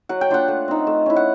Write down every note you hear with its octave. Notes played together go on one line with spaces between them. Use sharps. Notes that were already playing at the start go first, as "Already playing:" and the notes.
F#3 F#5
G5
A#3 D4 F4 F#5
A3
C4 D#4
A3
C#4 E4
F#5